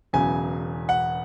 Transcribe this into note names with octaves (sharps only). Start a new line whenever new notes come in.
E1 E2 C#3 F#3 G#5
F#5